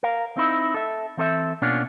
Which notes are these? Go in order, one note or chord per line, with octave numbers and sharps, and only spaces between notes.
A#4 F5
C4 D#4 E4
A4 E5
E3 C4 A4 D#5 E5
B2 A#3 C#4 D4 F4